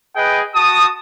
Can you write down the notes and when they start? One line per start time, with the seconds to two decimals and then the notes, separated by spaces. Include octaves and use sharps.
0.15 G#4 B4 D#5 G5
0.55 F#4 A5 D#6